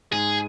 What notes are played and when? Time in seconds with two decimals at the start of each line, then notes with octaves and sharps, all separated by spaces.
0.11 G#2 G#3 G#4